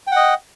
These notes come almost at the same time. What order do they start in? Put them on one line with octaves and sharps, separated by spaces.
G5 F#5 D#5